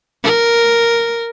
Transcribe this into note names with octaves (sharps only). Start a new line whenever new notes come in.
A#4